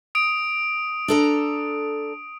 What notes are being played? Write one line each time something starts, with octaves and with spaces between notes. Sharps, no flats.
D#6 D7
D4 A4 A#5